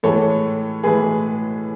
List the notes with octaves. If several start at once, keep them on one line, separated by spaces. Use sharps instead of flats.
A2 E3 G#3 A4 C#5
A2 E3 G#3 G#4 B4